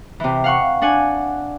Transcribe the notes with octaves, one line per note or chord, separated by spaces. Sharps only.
C3 E3
F5 F#5 C#6
D4 F#5 G#5